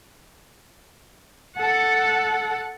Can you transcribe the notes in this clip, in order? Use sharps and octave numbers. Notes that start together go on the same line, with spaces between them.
A4 F#5